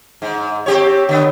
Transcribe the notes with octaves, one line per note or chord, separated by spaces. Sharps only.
G#2
C4 G4 C#5
D3 B3